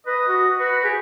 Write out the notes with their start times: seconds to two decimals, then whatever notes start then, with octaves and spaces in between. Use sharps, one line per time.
0.07 B4 D#5
0.28 F#4
0.59 F#4 B4
0.84 G4 G#4